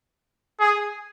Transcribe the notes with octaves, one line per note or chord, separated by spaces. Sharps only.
G#4